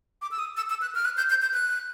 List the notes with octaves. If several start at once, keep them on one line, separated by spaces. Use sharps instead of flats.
D6
E6
D#6
E6
E6
F#6
F6
F#6
G6
G6
G6
F#6